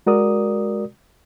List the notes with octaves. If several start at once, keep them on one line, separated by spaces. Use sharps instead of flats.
G#3 F#4 A#4 D5 D#6